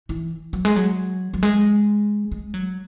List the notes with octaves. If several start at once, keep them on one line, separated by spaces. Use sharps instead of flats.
E3
F#3
G#3
F#3
F#3
G#3
G#3
F#3